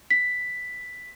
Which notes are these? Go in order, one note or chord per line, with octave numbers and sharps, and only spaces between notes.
B6